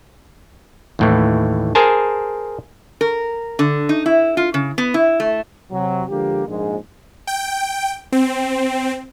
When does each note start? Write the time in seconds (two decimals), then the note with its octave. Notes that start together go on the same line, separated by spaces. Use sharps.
0.99 D#2 A2 E3
1.75 G#4 A#4 C5 G#5 A5
3.01 A#4
3.59 D3
3.89 D#4
4.06 E4
4.37 F4
4.54 C#3
4.78 B3
4.94 E4
5.20 A3
5.72 C3 F#3
6.10 D3 F3 G#3 A#3 G4
6.47 A#1 G#2 G#3
7.27 G5
8.12 C4